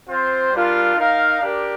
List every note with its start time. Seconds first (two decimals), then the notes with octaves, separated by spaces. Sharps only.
0.08 C4 F4 C5
0.52 G3 D4 F4 A#4
0.96 D#4 A#4 F5
1.42 D4 G4 A#4